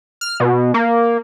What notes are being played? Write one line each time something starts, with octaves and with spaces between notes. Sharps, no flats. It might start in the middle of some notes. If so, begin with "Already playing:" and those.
F6
B2
A#3